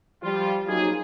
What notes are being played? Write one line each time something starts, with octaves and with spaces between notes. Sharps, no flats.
F3 G3 F4
F3 F#3 A#3 C#4 D#4 G#4